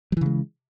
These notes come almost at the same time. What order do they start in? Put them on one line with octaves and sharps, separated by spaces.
F#3 E3 C#3 G#3